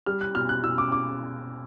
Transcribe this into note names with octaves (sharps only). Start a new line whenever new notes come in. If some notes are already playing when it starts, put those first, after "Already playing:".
G3 F6
F#6
B2 F6
F#6
B2 E6
D6
D6